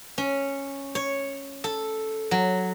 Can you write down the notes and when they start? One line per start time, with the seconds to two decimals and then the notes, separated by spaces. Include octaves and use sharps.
0.18 C#4
0.95 C#5
1.64 A4
2.31 F#3